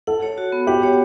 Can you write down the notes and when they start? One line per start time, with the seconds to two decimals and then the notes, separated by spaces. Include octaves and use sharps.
0.07 A4 F#5
0.22 C#5
0.38 F#4
0.52 B3
0.67 G4 F#5
0.83 C#5